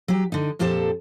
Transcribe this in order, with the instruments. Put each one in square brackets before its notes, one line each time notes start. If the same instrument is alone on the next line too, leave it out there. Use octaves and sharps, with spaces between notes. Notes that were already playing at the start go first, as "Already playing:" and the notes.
[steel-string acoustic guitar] F#3 G4
D3 D#4
F2 A#2 G4 A4 C5 A5